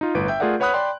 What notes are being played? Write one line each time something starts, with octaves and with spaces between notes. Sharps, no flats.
D#4 F4
G1 A2 B4 D7
E5 G5 G6
A3 F4 G#4 A#4 D5 F#5
B4 C#5 F#5 B5 D#6 F#6
D5 G5 B5 C6